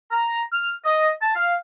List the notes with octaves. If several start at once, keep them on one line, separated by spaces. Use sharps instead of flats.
A#5
F6
D#5
A5
F5